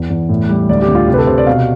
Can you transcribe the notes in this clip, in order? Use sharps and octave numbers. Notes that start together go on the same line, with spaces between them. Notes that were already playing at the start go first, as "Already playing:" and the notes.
Already playing: E2
E2
A2
G3
D2 D5
G4
D2
F4
C3 G4
B4
A4
C3 C5
D5
B2 F5